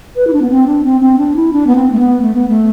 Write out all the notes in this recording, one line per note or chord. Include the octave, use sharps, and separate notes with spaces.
B4
E4
D4
B3
C4
D4
C4
C4
D4
E4
D4
B3
C4
A3
B3
A3
B3
A3